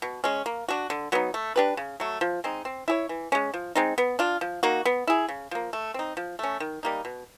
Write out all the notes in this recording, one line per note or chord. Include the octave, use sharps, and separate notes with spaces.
B2
G#3 C#4
A#3
D4 F#4
D3
F#3 B3 D#4
A3
D4 G4 B4
C#3
F#3 A3
F3
G#3 C4 D#4
C4
E4 G#4 C#5
E3
G#3 C#4
F3
G#3 C4 D#4
B3
D4 F4
F3
A#3 D#4 F#4
B3
E4 G#4
C#3
F3 A#3
A3
C4 D#4
F3
A3 C#4
D#3
G3 A#3 D#4
B2